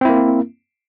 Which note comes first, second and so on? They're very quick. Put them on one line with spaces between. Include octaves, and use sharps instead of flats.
C4 E4 A#3